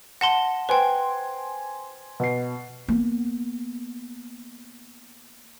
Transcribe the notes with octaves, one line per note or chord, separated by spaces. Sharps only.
F#5 A5 C6 A#6
B4 C5 G5 G#5 C6
B2 C7
A#3 B3